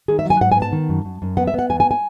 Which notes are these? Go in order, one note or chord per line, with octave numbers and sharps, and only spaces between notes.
D#3 G#4
E5
F#3 G#5
G#2 F#5
G#5
B3
A5
D#3
F#2
F#2
F#2
B3 F#5
E5
B3 F#5
E2 G#5
G#5
G#5